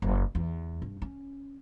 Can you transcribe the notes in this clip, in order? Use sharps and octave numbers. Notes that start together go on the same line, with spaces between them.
F#1
E2
G2
C#4